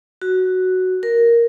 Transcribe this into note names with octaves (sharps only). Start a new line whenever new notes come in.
F#4
A#4